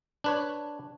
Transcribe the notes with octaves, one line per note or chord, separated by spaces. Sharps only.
D4 B4 C#5